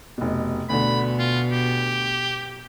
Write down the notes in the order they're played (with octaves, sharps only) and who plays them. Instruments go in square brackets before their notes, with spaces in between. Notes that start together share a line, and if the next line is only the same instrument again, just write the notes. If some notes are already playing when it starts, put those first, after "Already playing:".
[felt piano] F1 B2
[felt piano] D2 D3 [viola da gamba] B2 [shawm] B5
[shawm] F4
G4